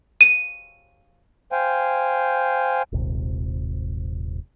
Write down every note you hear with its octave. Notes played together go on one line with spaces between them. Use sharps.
D#7
C5 F5 G5 G#5
D#1 G#1 C3